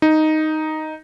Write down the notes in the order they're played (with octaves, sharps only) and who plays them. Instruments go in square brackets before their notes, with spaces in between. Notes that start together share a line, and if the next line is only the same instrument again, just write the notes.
[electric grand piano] D#4